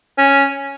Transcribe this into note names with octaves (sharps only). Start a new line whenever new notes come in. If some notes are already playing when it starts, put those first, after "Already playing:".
C#4